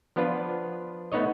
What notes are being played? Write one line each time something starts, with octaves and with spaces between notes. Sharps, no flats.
F3 B3 D4 F4 B4
A3 B3 D#4 C#5 D#5